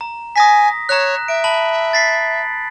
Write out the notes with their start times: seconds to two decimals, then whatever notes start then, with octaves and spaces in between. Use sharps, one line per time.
0.01 A#5
0.36 G#5 D#6 A#6 B6
0.89 C#5 A#5 F#6
1.28 E5 D7
1.44 A5 B5 F#7
1.93 A6 B6 C7